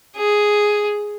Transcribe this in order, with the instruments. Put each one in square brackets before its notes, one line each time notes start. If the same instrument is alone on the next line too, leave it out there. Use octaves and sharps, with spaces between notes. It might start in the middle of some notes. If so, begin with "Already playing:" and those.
[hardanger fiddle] G#4